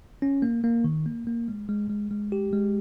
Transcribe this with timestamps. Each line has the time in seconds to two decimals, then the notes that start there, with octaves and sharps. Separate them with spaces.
0.22 C#4
0.42 A#3
0.64 A#3
0.84 D#3
1.06 A#3
1.27 A#3
1.48 G#3
1.69 G#3
1.90 G#3
2.11 G#3
2.32 G4
2.53 G#3